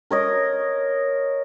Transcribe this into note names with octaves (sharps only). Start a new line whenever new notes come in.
A#4 C#5 D#5